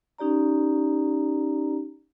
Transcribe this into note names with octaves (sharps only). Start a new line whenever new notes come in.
C#4 D#4 G4 D5 A#5